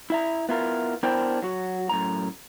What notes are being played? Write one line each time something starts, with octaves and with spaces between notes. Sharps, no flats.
E4 E5 A#5
B3 E4 F4 A#4
B3 D4 E4 A#4 C5 G5
F#3 F#4
F#2 A2 A#5